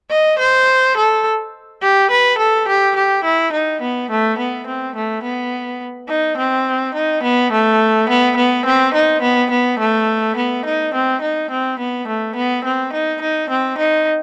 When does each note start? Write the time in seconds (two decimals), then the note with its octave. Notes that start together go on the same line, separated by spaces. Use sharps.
0.11 D#5
0.39 C5
0.97 A4
1.83 G4
2.11 B4
2.38 A4
2.68 G4
2.96 G4
3.24 E4
3.53 D#4
3.81 B3
4.11 A3
4.38 B3
4.67 C4
4.95 A3
5.23 B3
6.09 D#4
6.37 C4
6.95 D#4
7.23 B3
7.52 A3
8.09 B3
8.37 B3
8.66 C4
8.94 D#4
9.22 B3
9.51 B3
9.79 A3
10.37 B3
10.66 D#4
10.94 C4
11.22 D#4
11.51 C4
11.79 B3
12.08 A3
12.36 B3
12.65 C4
12.93 D#4
13.21 D#4
13.50 C4
13.78 D#4